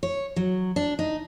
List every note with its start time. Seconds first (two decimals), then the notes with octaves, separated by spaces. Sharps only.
0.03 C#5
0.36 F#3
0.76 D4
0.99 D#4